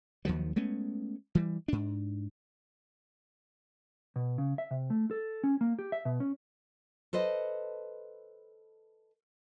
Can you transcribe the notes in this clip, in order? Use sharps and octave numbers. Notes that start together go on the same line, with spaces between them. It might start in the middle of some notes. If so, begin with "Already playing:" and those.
D#2 D#3 F3 F#3
G#3 A3 B3 C#4
E3 G3
G#2 D4
B2
C#3
E5
C3
A3
A4
C#4
A#3
G4
E5
B2
C#4
A4 B4 C5 D#5